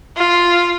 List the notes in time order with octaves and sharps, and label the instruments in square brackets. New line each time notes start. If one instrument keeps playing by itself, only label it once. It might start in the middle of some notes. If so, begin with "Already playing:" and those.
[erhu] F4